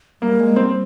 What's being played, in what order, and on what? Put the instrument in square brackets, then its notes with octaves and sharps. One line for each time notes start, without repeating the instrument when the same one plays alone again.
[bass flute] G3 [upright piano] A#3
[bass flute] G#3
[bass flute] G3 [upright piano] C4